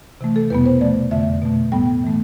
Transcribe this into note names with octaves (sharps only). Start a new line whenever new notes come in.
C3 E3 A3
A4
E2 B2 G3 B3 B4
C5
C3 F3 A3 D5
F2 D3 A3 E5
B2 A3
A2 G3 B3 G5
E3 A3